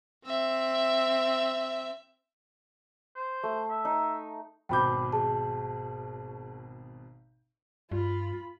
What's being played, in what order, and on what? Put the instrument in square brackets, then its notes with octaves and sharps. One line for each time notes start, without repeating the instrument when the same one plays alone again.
[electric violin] C4 E5
[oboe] C5
[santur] A3
[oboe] E5
[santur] D#4
[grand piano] G#1 B2 G6 [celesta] G5 B5 D6
[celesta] G#4 A5
[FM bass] G2 [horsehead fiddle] F4 B5